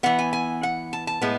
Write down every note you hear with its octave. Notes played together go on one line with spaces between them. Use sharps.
E3 B3 F#5
G#5
G#5
F#5
A5
A5
A2 G#3 B3